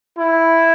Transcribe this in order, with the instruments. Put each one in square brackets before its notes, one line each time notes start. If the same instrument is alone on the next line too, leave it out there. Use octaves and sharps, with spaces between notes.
[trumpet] E4